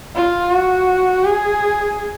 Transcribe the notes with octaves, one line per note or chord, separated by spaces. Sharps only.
F4
F#4
G#4